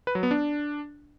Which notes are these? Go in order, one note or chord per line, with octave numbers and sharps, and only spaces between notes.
B4
F#3
B3
D4